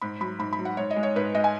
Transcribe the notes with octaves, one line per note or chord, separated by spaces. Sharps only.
G#2 B5
F#3 B5
G#2 B5
B5
F#3
F#5
G#2 C#5
D#5
G#3
C#5
G#2 B4
G#3 D#5
G#5